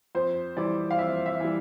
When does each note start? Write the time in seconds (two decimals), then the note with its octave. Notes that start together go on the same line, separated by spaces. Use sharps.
0.15 F2 C5
0.57 E3 G3 D5
0.91 F5
0.98 F2 E5
1.26 E5
1.40 E3 G3